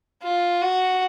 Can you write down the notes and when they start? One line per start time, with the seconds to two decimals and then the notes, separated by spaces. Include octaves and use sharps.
0.23 F4
0.62 F#4